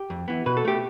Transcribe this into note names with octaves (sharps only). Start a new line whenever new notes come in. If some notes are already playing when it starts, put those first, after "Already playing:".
Already playing: G4
F2
E3 B3
B2 B4
A4
A3 G4